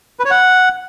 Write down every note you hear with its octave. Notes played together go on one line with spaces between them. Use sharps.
B4
C#5
F#5